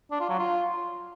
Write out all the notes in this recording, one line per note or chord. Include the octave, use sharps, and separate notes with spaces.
D4
F4
F#3
F4